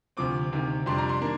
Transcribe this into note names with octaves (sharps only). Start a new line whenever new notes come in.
D2 C3 F3 C4 D6
D2 C3 D#3
F2 C3 G3 D4 C6
A#5
C6
D#3 A#3 D4